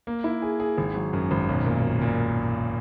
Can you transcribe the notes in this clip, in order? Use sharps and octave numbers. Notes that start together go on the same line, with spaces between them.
A#3
E4
G#4
G#4
G#1
F#3
F#2
G#1
B1
A#2
A#2
A#2